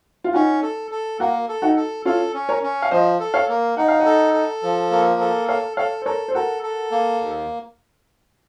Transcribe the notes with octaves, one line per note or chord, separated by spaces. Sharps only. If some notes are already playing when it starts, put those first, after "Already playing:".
F4
C#4 D#4 F#4
A4
A4
A#3 F#4 A#4
A4
D#4 F#4
A4
C#4 F4 A4
C#4
A#4 C#5
C#4
F5
F3 C5 D#5
A4
C#5 F5
A#3
D#4 F#5
F5
D#5 F#5
A4
A4
F3
A#3
A4
A4 C#5 F5
A4 C#5 F5
C5
A4 A#4 C#5
C5
F#4 A4 A#4
A4
A#3
D#2